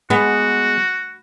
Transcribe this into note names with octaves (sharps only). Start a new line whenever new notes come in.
G#3 B3 F#4